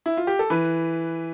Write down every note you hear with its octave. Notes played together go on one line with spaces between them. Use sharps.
E4
F4
G4
A4
E3 B4